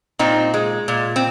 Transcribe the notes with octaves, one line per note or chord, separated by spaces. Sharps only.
A#2 C4 D#4
G#3
A#2
C4